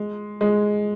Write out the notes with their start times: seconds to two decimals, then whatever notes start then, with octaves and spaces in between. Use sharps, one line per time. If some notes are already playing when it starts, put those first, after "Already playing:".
Already playing: G#3
0.41 G#3